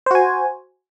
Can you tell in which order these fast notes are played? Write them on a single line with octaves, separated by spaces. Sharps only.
C5 F#4 G#5